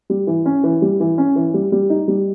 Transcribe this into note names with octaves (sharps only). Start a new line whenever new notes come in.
G3
E3
C#4
E3
G3
E3
C#4
E3
G3
G3
D#4
G3